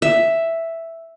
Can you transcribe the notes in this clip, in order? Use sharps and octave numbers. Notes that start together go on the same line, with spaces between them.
E5